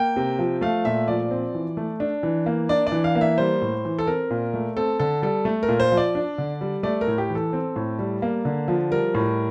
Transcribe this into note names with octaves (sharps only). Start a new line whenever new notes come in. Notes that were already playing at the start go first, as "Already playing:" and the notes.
Already playing: A#3 G5
C3
F3
A3 F5
A#2 E5
F3 D5
C4
E3
A3
D4
E3
A#3
D4 D5
D5
E3
F5
A#3
E5
G3 C5
A2
E3
A4
C4 A#4
A#2
A3
C4 A4
D3 A4
G3 A4
A3
A#4
A#2
C5
F3
D5
D4
D3
G3
A3 D5
A#4
A2
G4
E3
A4
C4
A2
G3
A#3
D3
F3
G3 A#4
A2